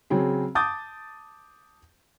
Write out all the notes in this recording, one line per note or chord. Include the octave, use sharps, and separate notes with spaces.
C#3 F#3 C4 G#4
A5 D6 D#6 G6 A6